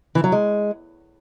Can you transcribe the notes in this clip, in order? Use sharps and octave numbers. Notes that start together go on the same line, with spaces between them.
E3
F#3
G#3